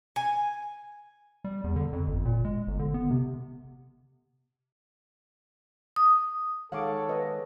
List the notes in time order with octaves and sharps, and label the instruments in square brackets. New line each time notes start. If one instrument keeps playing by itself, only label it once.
[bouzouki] G#5
[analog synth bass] G3
E2
D3
F2
G1
A#2
G#3
G1
D3
B3
C3
[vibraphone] D#6
[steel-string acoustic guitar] D#3 G#3 F#5 [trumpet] A4 [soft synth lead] C#5 [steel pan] F5 D6
[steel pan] B4 D#5 F5